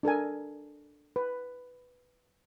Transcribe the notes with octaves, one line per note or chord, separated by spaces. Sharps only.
D4 A4 A#4 G#5
B4